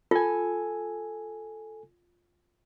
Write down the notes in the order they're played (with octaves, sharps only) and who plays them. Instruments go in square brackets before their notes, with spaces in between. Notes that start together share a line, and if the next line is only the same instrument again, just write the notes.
[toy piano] F4 [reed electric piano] A4 G#5